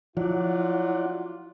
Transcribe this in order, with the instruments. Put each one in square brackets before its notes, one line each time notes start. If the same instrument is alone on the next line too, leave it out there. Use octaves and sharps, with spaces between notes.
[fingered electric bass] F3 [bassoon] F#3 [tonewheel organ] E4 D5 F#5 [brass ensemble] F4